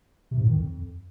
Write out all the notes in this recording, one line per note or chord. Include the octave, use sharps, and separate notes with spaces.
C3
G#2
A2
D#3
F2